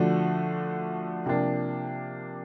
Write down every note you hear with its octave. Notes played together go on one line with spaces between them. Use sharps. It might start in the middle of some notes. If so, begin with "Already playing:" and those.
Already playing: D3 F3 A3 D4 F#4
C3 F3 A#3 D4